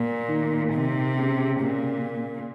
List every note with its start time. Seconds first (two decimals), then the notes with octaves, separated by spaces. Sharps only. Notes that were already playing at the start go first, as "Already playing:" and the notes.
Already playing: A#2
0.29 D#3
0.72 C3
1.16 C#3
1.60 A#2